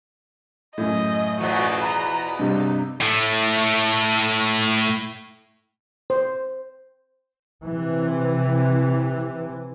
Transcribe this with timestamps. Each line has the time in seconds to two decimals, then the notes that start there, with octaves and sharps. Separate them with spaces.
0.78 F#2 A2 D#5
1.40 E2 B2 F3 F#4
1.82 A#5 B5
2.39 G2 C3 G3 D#4
3.01 A2 A3
6.10 C5
7.64 C3 E3